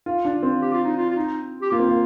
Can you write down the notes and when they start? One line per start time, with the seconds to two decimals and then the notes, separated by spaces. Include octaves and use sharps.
0.06 F4
0.25 D4
0.43 C4
0.61 G4
0.73 F4
0.84 D#4
0.97 F4
1.10 F4
1.16 D#4
1.62 G4
1.71 A#3 F4
1.79 C4
1.89 A#3